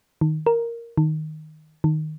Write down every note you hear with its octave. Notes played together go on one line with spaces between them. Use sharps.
D#3
A#4
D#3
D#3